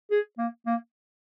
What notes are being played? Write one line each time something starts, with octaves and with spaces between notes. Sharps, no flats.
G#4
A#3
A#3